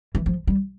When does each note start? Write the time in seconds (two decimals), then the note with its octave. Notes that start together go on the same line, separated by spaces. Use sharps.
0.15 E3
0.26 F3
0.47 G3